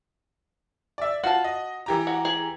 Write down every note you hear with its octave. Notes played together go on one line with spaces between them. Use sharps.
D5 E5
F4 F#4 A5
D#5
E3 G4 A#5
F#4
G#4